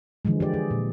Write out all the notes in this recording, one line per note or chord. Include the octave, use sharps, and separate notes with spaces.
D3 E3 F3 G#3
G4 D5
G#4
A#2